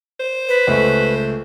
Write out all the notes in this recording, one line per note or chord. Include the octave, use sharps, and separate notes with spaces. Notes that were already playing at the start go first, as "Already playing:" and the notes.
C5
B4
C#2 A3